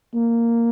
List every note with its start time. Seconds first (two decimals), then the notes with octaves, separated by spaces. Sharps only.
0.15 A#3